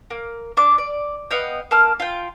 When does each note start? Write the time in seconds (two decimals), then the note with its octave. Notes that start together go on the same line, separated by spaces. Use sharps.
0.10 A#3
0.57 D4 D6
0.78 D5
1.31 B3 D#5 F5 G5
1.71 A#3 A5 F6
2.00 F4 G5